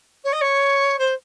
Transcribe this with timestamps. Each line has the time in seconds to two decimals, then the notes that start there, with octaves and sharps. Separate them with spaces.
0.24 C#5
0.32 D#5
0.41 C#5
0.99 C5